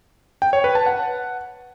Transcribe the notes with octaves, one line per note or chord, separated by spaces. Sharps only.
G5
C#5
B4
A5
F#5